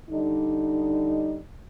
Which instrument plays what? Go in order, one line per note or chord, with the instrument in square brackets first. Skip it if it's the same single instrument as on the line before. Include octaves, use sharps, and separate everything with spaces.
[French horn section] D3 G3 D#4